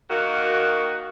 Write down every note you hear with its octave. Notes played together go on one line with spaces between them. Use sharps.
D#3 A#3 F#4